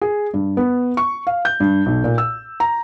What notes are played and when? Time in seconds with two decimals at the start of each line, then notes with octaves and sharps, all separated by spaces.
0.01 G#4
0.34 G2
0.57 B3
0.97 C#6
1.27 F5
1.45 G6
1.60 G2
1.86 B1
2.04 A#2
2.18 E6
2.60 A#5